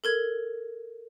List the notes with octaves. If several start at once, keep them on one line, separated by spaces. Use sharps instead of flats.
A4 A#4 G#6